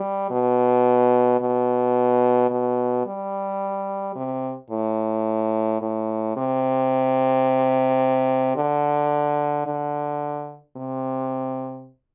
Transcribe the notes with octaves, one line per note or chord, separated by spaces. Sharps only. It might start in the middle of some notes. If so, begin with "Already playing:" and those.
Already playing: G3
B2
B2
B2
G3
C3
A2
A2
C3
D3
D3
C3